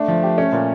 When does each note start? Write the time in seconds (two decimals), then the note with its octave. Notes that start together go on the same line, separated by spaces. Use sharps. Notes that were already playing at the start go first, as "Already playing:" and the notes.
Already playing: A3 D4
0.08 F3
0.23 G4
0.38 C#4
0.53 A#2